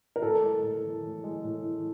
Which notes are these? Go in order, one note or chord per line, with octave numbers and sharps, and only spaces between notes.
A#4
A2 A4
G#3
A2
E3
A2
G#3
A2
E3